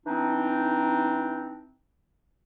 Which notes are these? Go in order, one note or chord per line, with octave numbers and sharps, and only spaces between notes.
E3 C4 D4 D#4